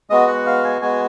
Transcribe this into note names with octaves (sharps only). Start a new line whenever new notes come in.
G#3 B3 F#4 D#5
F#5
F5
G#5
G#3 B3 F#4 G#5